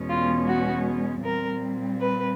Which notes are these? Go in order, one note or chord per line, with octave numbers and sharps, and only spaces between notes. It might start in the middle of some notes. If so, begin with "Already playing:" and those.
Already playing: E2 B2 G#3 C#4
F4
F#4
A#2 G3 C4 A#4
B4